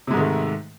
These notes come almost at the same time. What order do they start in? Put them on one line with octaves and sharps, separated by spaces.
C3 G#3 G#2 D#3 A3